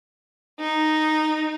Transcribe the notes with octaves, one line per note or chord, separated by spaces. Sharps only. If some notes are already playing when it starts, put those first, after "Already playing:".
D#4